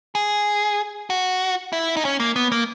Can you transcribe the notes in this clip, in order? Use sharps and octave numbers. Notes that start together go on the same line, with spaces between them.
G#4
F#4
E4
D#4
C#4
A#3
B3
A#3